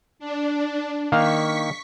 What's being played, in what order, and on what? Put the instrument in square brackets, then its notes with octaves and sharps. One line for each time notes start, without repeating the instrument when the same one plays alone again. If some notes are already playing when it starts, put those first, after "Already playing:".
[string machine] D4
[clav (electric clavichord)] D#3 A#3 F5 [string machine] C#6 B6